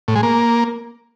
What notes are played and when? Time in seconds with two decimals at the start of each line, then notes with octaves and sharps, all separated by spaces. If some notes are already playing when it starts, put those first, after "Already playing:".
0.08 A2
0.16 G#3
0.23 A#3